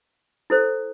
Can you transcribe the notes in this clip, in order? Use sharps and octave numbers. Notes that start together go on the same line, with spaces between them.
E4 A4 C5